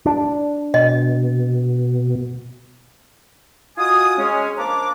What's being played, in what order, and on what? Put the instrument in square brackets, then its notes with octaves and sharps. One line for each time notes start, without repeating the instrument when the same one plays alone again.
[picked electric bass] D4
[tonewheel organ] B2 [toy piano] D#5
[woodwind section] F4 F#4 D#5 G#5 D#6
G#3 C#4
F3 A#3 D4 A#5 D6